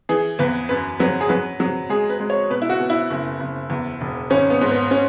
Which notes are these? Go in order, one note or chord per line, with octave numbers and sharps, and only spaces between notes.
E3 G#4
E2 B4
F#2 B4
F#3 B4
G#4
F#3 B4
F#3
G#3 G#4
B4
G#3
C#5
B2 B4
E4
F#4
B2
E4
F#1
F#1
E2
E1
G#1 C#4
B3
G#2
B3
C#4